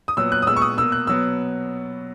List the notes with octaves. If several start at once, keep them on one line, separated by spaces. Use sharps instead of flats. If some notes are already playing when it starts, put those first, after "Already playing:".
D#6
A#2 F#3 B3 E6
F#6
D#6
A#2 G#3 B3 E6
C#6
D#6
B2 A#3 E6
F#6
B2 F#3 B3 E6